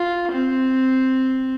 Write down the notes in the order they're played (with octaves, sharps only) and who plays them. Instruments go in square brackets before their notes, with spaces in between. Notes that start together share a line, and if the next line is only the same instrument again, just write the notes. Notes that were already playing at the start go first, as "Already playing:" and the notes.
Already playing: [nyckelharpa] F4
C4